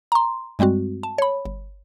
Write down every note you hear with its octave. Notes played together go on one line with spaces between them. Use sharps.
A#5 C6
G2 G3 G#3 C4 F#4
A5
C#5 B5
G1